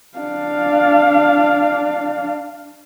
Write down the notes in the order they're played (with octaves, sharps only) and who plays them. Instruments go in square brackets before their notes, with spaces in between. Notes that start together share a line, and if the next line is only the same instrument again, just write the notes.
[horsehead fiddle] D4 F5